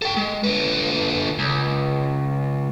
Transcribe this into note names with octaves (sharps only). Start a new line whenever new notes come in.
A4 G5
G#3
D3 B4
C#2